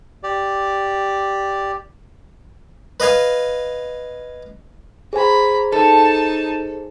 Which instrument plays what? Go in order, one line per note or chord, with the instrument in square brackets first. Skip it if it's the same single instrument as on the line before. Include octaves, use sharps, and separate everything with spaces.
[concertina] G4 D5
[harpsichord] B4 D#5 F5 G#5
[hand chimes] G#4 C5 G#5 [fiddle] A#5 B5
[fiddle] D#4 A5 [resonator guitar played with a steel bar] A4